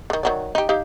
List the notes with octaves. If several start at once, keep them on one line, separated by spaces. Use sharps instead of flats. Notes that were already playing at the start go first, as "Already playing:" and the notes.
D3 D#3
D#3 F#3 D5
D#4 G4
D#4 G4 F5